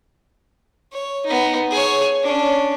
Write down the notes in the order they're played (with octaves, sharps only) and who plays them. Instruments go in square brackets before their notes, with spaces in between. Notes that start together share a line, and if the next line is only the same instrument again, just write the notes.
[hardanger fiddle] C#5
B3 D#4
G#4 C#5
C#4 D4